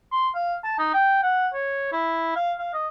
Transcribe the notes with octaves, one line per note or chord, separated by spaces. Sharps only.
C6
F5
A5
D#4
G5
F#5
C#5
E4
F5
F5
D#5